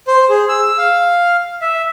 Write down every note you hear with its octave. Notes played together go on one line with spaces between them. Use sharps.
C5
G#4
E6
F5
E5